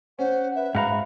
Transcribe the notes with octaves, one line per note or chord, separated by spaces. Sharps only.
C#4 C5 F#5
B4 E5
G#2 F#4 F5 A#5 B5